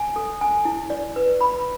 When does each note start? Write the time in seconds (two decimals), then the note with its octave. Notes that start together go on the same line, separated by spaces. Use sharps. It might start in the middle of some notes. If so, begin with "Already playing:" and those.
Already playing: G#5
0.16 A4
0.41 G#5
0.65 E4
0.90 D5
1.16 B4
1.41 B5